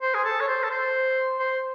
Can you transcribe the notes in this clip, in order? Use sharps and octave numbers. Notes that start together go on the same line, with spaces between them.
C5
G#4
A4
C#5
C5
A4
C5
C5